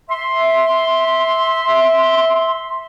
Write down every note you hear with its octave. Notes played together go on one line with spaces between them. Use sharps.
E5 C6